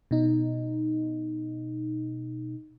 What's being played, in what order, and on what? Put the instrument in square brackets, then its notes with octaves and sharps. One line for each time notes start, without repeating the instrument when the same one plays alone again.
[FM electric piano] B2 D#4